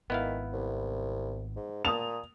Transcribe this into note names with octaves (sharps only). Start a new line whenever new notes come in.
G#1 D#3 B3 E4 F5
C2
G#2
A#2 A5 D#6 F7